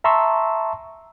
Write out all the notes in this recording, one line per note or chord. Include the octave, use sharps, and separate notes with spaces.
E5 A5 A#5 C6 C#6 E6